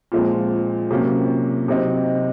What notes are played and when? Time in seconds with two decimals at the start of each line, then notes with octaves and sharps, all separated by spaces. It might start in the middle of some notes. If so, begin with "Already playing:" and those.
0.12 A#2 F3 G#3 C4
0.91 C3 F#3 A#3 C#4
1.68 C3 F#3 C4 D#4